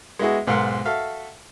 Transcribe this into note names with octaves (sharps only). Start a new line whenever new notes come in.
G#3 B3 E4 F#4 G#4
B1 G#2 A#4 F5 F#5 C6
F#4 A4 E5 F5